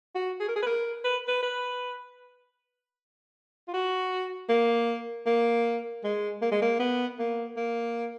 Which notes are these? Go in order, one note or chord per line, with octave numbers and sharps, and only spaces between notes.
F#4
G#4
A#4
G#4
B4
A#4
B4
B4
B4
F4
F#4
A#3
A#3
G#3
A#3
G#3
A#3
B3
A#3
A#3